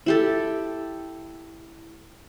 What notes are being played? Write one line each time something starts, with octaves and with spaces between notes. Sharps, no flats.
E4 G4 A4